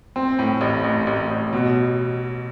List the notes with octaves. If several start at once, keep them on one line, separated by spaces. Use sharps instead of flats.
C4
A2
A1
A1
A1
A1
B2